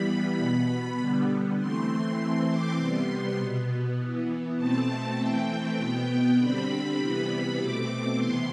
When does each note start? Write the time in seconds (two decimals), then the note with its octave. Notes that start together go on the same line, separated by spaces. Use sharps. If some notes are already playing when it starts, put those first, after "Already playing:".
Already playing: E3 G3 B3 B5
0.37 B2 B3
0.98 D3 G3 B3
1.57 E3 A3 C4 C6
2.17 E3 A3 C4 C6
2.48 D6
2.77 C3 G3 B3 C6
3.37 B2 B3
3.97 E3 B3
4.56 B2 A3 C4 A5
5.16 E3 A3 C4 G5
5.77 B2 B3
6.37 D3 G3 C4 B5
6.97 C3 E3 G3 B3
7.56 B2 A3 C4 D6
8.17 C3 E3 B3 C6